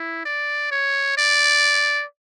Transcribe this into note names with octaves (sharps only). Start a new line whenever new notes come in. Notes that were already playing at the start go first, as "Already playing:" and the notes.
Already playing: E4
D5
C#5
D5